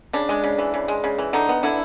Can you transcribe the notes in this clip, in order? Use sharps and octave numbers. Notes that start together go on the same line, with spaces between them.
C#3 D4
G#3
C#3
E3
C#3
G#3
C#3
E3
D3 D#4
B3
D3 E4